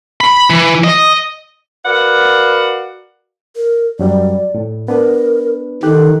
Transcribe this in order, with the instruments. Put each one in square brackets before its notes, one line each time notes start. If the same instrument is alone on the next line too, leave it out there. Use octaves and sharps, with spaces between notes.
[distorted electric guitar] B5
E3
D#5
[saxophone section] F#4 A#4 B4 D5 F5 F#5
[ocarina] A#4
[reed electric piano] F#2 F#3 G3 [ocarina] D5
[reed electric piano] A2
[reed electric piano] B3 D4 B4 [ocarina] A#4
[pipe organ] D#3 [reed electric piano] G4 F#6 [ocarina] A4